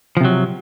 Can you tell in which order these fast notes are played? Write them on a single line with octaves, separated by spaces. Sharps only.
F3 C3 F#3